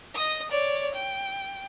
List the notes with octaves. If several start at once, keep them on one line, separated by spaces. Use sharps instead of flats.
D#5 D#6
C#5 D5
G5